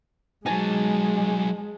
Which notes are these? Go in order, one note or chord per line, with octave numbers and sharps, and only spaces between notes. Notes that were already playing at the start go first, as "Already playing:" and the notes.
F#3 G#3 D#4 G#5 A5